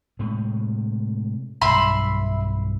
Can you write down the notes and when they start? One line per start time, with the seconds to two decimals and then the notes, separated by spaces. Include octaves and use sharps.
0.19 A2 C3 G#3
1.62 B1 G2 E5 B5 C6